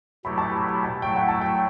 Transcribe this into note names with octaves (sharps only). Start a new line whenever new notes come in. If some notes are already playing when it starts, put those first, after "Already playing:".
B2 F#3 A3 E4 G4 B5
A5
B5
A5
F#3 A3 E4 G5
F#5
A5
G5